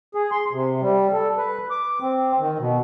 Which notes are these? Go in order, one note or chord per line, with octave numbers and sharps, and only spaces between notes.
G#4
C6
C3
G3
A4
B4
D6
C4
D#3
B2